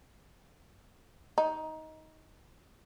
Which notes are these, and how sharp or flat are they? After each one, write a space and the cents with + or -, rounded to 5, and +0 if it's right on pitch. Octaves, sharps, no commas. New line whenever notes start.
D#4 +15